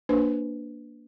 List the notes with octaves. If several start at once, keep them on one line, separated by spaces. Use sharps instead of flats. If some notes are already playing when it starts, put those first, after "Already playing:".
A#3 D4 B4 C5